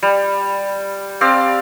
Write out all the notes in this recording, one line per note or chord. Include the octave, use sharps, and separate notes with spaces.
G3
C4 G4 D5 F5